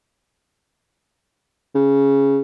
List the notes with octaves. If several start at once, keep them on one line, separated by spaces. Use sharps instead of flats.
C#3